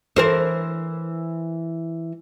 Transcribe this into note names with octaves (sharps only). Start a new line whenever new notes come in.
E3 A#4 C5